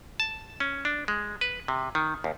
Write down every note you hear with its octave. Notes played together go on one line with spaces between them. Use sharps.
A5
C#4
D4
G#3
B4
C3
D#3
D#2